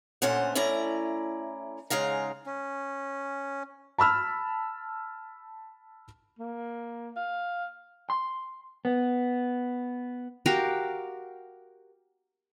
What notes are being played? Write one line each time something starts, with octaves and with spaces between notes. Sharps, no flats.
A#2 D3 A3 C#4 C5 F#5
A3 C#4 E4 D5 A#5
G#2 C#3 G#3 F5 A#5
C#4
A5 B5 E6 F6
A#3
F5
C6
B3
F#4 G4 A#4 F5